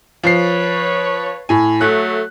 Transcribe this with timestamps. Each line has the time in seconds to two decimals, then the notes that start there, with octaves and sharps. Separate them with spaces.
0.23 F3 B4 C#5 C7
1.49 A2 G#5
1.81 F#3 A3 F#6